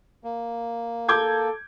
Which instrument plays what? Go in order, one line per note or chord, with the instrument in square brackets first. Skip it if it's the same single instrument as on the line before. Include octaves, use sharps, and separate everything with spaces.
[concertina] A#3
[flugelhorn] A4 [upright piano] D6 G6 G#6